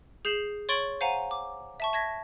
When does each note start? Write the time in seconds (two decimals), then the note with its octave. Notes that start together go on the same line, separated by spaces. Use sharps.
0.25 G#4 G6 C7 E7 F#7
0.69 C#5 C6 C#6 A6 D7 F#7
1.01 C5 F5 F#5 G#5 A#5 D#7
1.31 D6
1.80 E5 A5 C#6
1.93 A5 G#6 A#6 B6